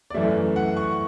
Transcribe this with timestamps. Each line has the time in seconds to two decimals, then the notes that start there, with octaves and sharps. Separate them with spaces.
0.10 D5
0.14 F#2 E3 A3 E5
0.56 F#5
0.77 C#6